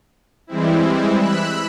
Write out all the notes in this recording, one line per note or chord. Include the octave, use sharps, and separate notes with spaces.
E3 G3 G#3 C4 E4
B5 E6 F#6